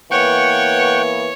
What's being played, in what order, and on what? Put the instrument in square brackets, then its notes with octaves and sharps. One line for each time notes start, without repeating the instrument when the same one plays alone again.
[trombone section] E3 A#3 B3 [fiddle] C#5 [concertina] F#5 G5 C#6